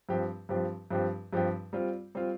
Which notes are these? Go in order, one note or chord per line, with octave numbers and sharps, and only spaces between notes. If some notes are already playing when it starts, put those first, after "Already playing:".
G2 F3 C4 G4
G2 F3 C4 G4
G2 F3 C4 G4
G2 F3 C4 G4
G3 C4 F4
G3 C4 F4